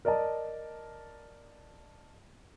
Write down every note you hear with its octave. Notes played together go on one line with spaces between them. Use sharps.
A#4 D5 D#5 A5